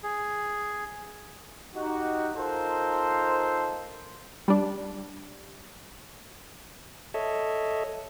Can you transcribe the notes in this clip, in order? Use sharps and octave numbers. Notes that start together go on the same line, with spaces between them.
G#4
D#4 F#4 G4
D#4 F4 A4 A#4 C5
G3 D4
A4 C#5 D#5 E5